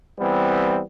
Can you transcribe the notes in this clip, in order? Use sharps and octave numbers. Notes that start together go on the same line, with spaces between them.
E3 G3 B3 C4